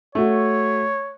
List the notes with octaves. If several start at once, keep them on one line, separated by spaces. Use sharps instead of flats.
A3 F#4 C#5